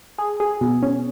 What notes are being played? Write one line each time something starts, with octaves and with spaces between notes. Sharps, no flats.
G#4
G#4
B2
C#4